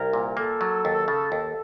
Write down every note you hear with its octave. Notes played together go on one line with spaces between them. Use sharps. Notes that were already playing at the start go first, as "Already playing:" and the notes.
Already playing: C2 A#4
A#2
A#3 A4
F#3
D#2
C#3
D#2